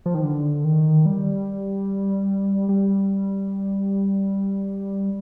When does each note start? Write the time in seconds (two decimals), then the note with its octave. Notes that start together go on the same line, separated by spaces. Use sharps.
0.06 F3
0.14 D#3
0.23 D3
0.65 D#3
1.06 G3
2.69 G3